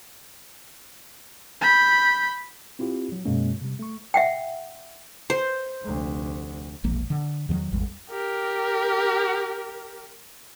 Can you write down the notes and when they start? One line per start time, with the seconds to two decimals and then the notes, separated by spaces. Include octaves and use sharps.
1.61 B5 G6
2.79 C4 E4 F4 G4
3.12 F#3
3.25 F#2 B2 G#3 A#3 C#4
3.61 C3 G3
3.79 A3 C#6
4.14 E5 F#5 G5
5.30 C5
5.83 F1 D2
6.84 E1 A#1 A#3
7.10 D3
7.49 E2 D#3 F3 F#3
7.72 G#1 E2 G3
8.10 G4 A#4